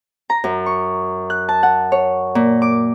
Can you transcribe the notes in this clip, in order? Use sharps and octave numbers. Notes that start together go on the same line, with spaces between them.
A#5
F#2
C#6
F#6
A5
F#5
C#5
A#2
D6